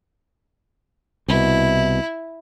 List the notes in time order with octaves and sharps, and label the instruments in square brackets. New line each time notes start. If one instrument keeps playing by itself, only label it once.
[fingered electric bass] C2 B2 [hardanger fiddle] E4